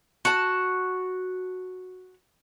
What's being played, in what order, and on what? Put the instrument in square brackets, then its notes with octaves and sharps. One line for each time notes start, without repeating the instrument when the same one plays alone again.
[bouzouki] F#4 A5